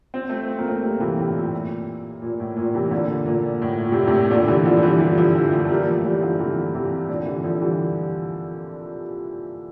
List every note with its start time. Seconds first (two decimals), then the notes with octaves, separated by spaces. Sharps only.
0.14 C4
0.29 A3 C4
0.48 C4
0.59 A#3
0.68 A3 C4
0.83 G3 A#3
1.00 C3 E3
1.18 A2 C3
1.35 A#2
2.22 A#2
2.40 A2
2.57 A#2
2.74 C3 E3
2.91 A#2 D3
3.26 A#2
3.62 A2
3.85 A#2
3.92 C3
3.99 A#2
4.07 A2 C3
4.30 A#2 D3
4.48 C3 E3
4.66 D3 F3
4.77 F3
4.83 E3 G3
5.00 E3 G3
5.18 D3 F3
5.35 E3 G3
5.53 F3 A3
5.65 A3
5.70 G3 A#3
5.81 G3
5.87 F3 A3
6.05 E3 G3
6.22 D3 F3
6.39 C3 E3
6.74 C3 E3
7.09 A#2 D3
7.26 C3 E3
7.44 D3 F3
7.61 E3 G3